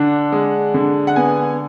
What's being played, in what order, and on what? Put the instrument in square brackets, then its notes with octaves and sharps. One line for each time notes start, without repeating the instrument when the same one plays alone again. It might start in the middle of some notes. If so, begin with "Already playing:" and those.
Already playing: [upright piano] D3 D4 F#5
G#3
D3
F#5
B3 G#5